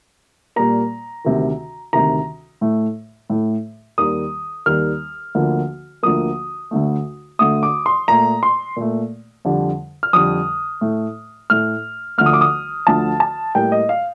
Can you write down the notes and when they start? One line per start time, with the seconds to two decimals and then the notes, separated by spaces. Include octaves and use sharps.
0.56 A#2 G3 A#3 A#5
1.25 D2 C3 D#3
1.93 D2 C3 D#3 A#5
2.61 A2 A3
3.30 A2 A3
3.98 D#2 D#3 G3 D#6
4.66 D#2 D#3 G3 F6
5.35 D2 D3 F3 A#3
6.03 D2 D3 F3 A#3 D#6
6.71 D2 D3 A3
7.39 D2 D3 A3 D#6
7.63 D6
7.86 C6
8.08 A#2 A3 A#5
8.43 C6
8.76 A#2 A3
9.45 F2 D3 G3
10.03 F6
10.13 F2 D3 G3 D#6
10.81 A2 A3
11.50 A2 A3 F6
12.18 D2 D3 F3 A3 F6
12.26 D#6
12.33 D6
12.41 D#6
12.86 D2 D3 F3 A3 A5
13.20 A5
13.55 A2 G3 A#3 G5
13.72 D#5
13.89 F5